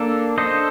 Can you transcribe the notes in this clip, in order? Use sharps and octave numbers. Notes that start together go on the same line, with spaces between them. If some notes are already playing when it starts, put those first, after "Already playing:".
Already playing: A#3 D4 A4
D4 A4 C5 D#5